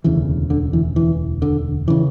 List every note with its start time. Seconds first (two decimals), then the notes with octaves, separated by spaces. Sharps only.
0.04 E1 D2 C#3 E3
0.50 D3
0.73 E3
0.96 E3
1.42 D3
1.88 C#3 E3